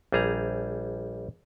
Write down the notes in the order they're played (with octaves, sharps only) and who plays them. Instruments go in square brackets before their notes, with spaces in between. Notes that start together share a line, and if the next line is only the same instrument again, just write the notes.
[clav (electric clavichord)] A#1 G3 G#4 A#5